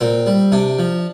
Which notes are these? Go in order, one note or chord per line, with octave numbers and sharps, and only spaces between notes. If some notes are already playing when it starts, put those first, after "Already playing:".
A#2 C4
G3
C3 D4
F3